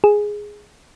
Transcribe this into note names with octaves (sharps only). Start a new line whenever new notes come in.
G#4